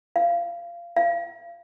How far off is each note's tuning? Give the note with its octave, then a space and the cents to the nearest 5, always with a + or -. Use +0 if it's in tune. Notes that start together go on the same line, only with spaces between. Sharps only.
F5 -20
F5 -30